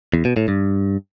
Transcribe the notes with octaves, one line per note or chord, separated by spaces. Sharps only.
E2
B2
A2
G2